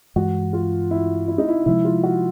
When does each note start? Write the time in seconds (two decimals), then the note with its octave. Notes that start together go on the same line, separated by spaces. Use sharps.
0.16 G2 E3 G#3 F#4
0.53 F4
0.91 E4
1.28 E4
1.38 D#4
1.49 E4
1.66 C3 F3 G#3 E4
1.85 F4
2.03 F#4